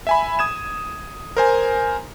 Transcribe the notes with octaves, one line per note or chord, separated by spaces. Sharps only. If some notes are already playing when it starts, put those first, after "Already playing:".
E5 G#5 B5
D#6 G#6 E7
A#4 C5 G#5